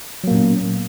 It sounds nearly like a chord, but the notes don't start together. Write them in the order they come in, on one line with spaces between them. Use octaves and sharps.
F#3 A#3 A#2 C#4 B3